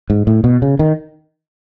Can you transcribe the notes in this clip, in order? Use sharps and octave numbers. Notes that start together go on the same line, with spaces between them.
G#2
A2
B2
C#3
D#3